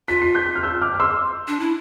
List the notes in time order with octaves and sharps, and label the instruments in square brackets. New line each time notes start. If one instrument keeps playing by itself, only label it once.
[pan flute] F4 [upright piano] B6
[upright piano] C7
G6 B6
F6
E6 G6
D6 F6
F6
C6 E6
[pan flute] D4
E4